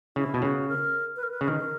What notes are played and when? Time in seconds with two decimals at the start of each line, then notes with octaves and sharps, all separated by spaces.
0.16 C#3 E4
0.34 B2
0.42 C#3 F#4
0.69 A#4
1.16 B4
1.23 A#4
1.31 B4
1.41 C#3
1.48 D#3 A#4